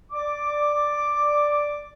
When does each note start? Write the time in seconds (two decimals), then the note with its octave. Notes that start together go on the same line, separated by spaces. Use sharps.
0.12 D5 D6